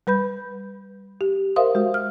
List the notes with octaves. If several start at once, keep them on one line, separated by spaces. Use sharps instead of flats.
G3 B4 B5 G6
G4
A#4 C5 E5 F5 C6 D#6
G#3 F#4
F6